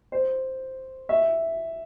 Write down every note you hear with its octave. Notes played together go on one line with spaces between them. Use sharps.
C5
E5